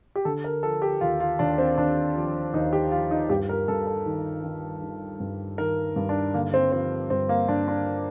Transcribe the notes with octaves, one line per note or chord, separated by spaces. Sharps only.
G4
D3 A4
A#4
F3 A4
G4
D#2 F4
F4
D#2 D4
C4
D#2 D4
F3
D#2 D#4
G4
F3 F4
D#4
G2 G4
A#4
G2 A4
A4
D#3
D#3
D#3
G2
D#3 A#4
G2
D4
D3 A#3
C4
F3 C4
G2 C4
A#3
G2 D4
D4